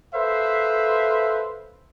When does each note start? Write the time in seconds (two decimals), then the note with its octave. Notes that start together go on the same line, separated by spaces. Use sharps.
0.15 A4 B4 C5 E5 F5